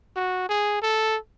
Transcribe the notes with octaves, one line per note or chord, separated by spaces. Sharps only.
F#4
G#4
A4